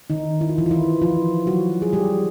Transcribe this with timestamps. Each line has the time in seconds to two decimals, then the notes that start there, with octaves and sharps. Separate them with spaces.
0.10 D#3 D#4
0.41 E4
0.49 F4
0.58 E3 E4
0.66 F4
0.71 E3 E4
1.02 F3 F4
1.47 F#3 F#4
1.82 G#4
1.93 G3 G4